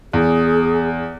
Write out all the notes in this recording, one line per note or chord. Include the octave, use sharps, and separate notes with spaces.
E2 G#4